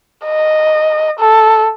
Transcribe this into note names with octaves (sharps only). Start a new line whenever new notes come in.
D#5
A4